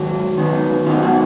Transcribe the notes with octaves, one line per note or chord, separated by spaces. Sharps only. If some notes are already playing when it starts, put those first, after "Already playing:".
Already playing: G#2 D#3 F#3
G#2 D#3 F#3 B3 D#4
G#2 D#3 F#3 B3 D#4 F4
F#4